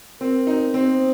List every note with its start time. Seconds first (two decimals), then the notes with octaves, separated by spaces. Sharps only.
0.21 C4 A#4
0.47 D#4
0.74 C4 C5